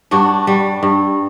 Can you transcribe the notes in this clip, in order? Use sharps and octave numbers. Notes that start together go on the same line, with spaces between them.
G2 D4 F#4
G3
G2